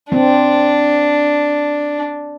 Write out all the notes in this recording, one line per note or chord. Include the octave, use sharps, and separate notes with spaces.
C4 D4